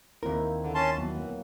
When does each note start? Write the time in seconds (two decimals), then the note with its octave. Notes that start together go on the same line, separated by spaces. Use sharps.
0.23 D#2 A#3 C4 E4 A#4
0.63 D3
0.75 C#4 A5 C6
0.98 E3 F#3 B3
1.17 A#3